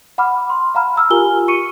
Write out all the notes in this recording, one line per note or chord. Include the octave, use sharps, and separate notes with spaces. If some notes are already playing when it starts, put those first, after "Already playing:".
F#5 B5 D6 F6
C6
F5 F#5 A#5 B5 F6
A#5 E6 F6
F4 G4 A#4 G#5 G7
C#6 C#7 D#7